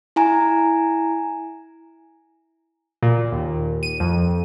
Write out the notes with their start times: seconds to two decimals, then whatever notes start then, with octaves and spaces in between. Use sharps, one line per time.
0.16 E4 G#5 A#5
3.03 A#2
3.32 D#2
3.83 D#7
4.00 F2